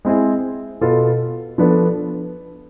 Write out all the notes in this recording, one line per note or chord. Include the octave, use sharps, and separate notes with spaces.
G#3 C4 E4 G#4
B2 B3 F4 A4
F3 B3 D4 A4